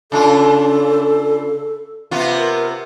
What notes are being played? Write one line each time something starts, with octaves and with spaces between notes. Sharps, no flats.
C#3 D4 F4 A4
C3 B3 F4
A#4